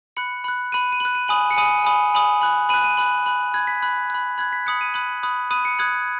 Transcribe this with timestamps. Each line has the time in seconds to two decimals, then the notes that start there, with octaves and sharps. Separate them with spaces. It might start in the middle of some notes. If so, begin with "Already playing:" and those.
0.17 B5 F#6 C#7
0.44 B5 F#6
0.72 B5 F#6 D#7
0.92 D#7
1.00 B5 F#6 F#7
1.15 D#7
1.28 G#5 B5 D#6 F#7
1.51 C#7
1.56 G#5 B5 D#6 D#7
1.85 G#5 B5 D#6
2.14 G#5 B5 D#6
2.42 B5 F#6
2.69 B5 F#6 D#7
2.84 D#7
2.97 B5 F#6 F#7
3.26 B5 F#6
3.54 B5 F#6 G#6
3.67 B6
3.82 B5 F#6
4.10 B5 F#6
4.38 B5 F#6 G#6
4.53 B6
4.66 B5 D#6 F#6 C#7
4.81 D#7
4.94 B5 D#6 F#6 F#7
5.23 B5 D#6 F#6
5.50 B5 D#6 F#6 D#7
5.65 C#7
5.79 B5 D#6 F#6 G#6